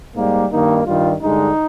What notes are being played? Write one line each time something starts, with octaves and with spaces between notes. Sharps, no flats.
G#2 G3 A#3
G2 D#3 A#3 D#4
G2 D#3 G3 F4
G2 D3 G#3 D#4